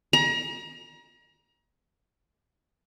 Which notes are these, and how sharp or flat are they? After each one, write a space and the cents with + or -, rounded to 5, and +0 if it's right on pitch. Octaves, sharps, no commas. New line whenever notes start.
A#5 +35